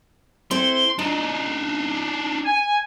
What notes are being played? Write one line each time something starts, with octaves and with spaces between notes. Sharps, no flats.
C4 E4 A4 C6
D4 D#4 D#5
G#5